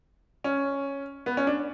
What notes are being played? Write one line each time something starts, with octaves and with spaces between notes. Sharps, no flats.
C#4
B3
C#4
D4